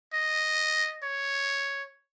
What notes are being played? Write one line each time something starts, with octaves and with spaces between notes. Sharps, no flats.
D#5
C#5